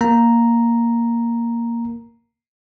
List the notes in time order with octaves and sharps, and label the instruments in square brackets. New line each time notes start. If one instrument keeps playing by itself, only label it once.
[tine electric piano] A#3 A#5